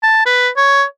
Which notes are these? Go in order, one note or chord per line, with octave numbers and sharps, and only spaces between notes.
A5
B4
C#5